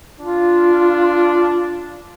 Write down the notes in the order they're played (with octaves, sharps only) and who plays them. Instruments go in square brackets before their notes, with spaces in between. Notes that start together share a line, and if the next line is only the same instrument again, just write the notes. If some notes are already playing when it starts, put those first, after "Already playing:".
[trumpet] D4 [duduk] F4